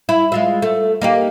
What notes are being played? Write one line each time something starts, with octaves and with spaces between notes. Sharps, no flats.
E4
G#3 F4 E5
A3
A#3 D#4 G4